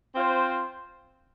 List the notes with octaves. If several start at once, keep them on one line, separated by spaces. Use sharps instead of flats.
C4 F4 C5